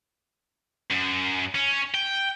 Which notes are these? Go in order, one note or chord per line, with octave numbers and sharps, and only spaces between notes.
F#2
C#4
G5